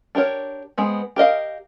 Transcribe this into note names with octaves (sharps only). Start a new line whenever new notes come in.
D4 G4 A#4 C#5
G#3 B3 C4
G4 A#4 D#5 F5